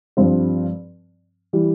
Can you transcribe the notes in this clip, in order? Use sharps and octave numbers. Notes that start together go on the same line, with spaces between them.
G2 F3 C4
E3 G3